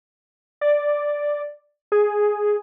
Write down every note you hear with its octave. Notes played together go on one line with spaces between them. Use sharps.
D5
G#4